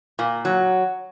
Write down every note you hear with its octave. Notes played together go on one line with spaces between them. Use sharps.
A#2
F#3